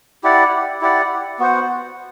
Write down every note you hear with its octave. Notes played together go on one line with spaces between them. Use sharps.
E4 G4 D5 F#5
E4 G4 D5 F#5
B3 F#4 C5 F#5